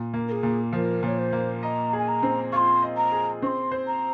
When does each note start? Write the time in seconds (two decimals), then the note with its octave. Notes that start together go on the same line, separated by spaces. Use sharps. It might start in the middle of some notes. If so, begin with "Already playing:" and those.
Already playing: A#2
0.14 A#3
0.28 A#4
0.31 G#4
0.43 A#2
0.73 F3 A#4
1.03 A#2 C#5
1.19 C5
1.33 A#3
1.62 D#5 A#5
1.93 G#4
1.99 G#5
2.08 A#5
2.23 C4
2.52 F4 C6 C#6
2.82 D#5
2.97 A#5
3.12 G#4
3.42 C4 C#6
3.46 C6
3.72 C5
3.87 A#5